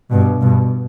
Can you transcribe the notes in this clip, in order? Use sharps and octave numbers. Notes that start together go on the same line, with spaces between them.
G2 B2
G2 B2